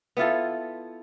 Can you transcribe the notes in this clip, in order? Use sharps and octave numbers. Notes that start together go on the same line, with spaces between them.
B3 E4 F4 A4